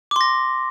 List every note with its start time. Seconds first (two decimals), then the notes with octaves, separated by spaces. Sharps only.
0.11 D6
0.16 C6
0.21 A#6